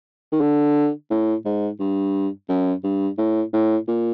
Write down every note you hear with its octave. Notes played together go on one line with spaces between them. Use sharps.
D#3
D3
A2
G#2
G2
F#2
G2
A2
A2
A#2